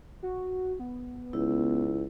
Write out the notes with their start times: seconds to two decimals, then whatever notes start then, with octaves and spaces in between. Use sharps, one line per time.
0.22 F#4
0.79 B3
1.33 C#2 E4